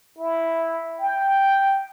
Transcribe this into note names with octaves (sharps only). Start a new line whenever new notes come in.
E4
G5